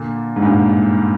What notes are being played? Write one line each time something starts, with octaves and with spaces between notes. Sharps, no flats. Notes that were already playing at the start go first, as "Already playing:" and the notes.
Already playing: A#2 D3
G#2
G2 A#2